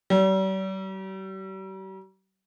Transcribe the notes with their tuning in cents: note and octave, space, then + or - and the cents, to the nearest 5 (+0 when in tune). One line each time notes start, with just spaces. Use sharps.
G3 -40